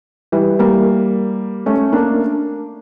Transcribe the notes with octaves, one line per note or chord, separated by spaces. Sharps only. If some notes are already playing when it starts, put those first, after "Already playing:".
E3 G3
G3 A#3
A3 C#4
A#3 D4